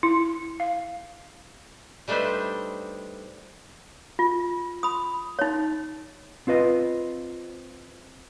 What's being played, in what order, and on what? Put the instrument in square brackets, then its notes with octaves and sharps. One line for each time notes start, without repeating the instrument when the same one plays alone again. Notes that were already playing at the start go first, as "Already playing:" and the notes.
[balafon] E4
F5
[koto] G3 A3 D4 D#4 B4 C5
[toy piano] F4
B5 D#6
D#4 C#5
[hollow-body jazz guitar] C4 F4 B4 D#5